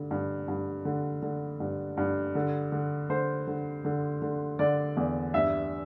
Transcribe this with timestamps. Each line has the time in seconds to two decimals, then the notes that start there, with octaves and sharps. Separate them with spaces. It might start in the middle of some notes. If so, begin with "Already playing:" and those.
Already playing: G2 D3
0.11 G2
0.48 G2
0.85 D3
1.22 D3
1.60 G2
1.97 G2
2.35 D3
2.72 D3
3.09 D3 C5
3.47 D3
3.85 D3
4.22 D3
4.59 D3 D5
4.96 E2 D5
5.34 G2 E5